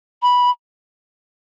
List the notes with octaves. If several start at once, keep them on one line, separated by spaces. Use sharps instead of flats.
B5